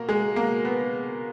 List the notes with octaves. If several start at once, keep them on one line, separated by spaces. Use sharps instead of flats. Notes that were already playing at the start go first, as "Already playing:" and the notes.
Already playing: B2 A#3 A#4
G#3 G#4
B2 A#3 A#4
B3